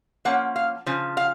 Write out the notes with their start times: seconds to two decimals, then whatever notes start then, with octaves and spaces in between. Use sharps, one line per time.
0.25 F3 A#3 C#4 F#5
0.56 F5
0.86 C#3 F3
1.17 F5